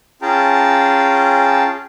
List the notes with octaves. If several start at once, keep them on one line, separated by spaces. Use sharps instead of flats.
C#4 F4 G#4 G5 A5 A#5